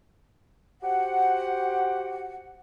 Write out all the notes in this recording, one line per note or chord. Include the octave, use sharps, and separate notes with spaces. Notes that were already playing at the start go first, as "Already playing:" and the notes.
F#4 G4 C5 F#5